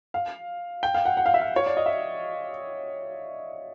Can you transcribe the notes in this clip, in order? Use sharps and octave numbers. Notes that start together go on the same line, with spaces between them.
F5
G5
F5
F#5
F#5
F5
E5
F5
C#5
D5
D#5
E5